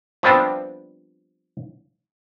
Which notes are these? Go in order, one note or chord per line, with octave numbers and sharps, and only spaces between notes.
F3 G3 B3 C4 D4